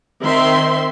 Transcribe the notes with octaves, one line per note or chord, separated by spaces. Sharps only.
D#3 C4 E5 C6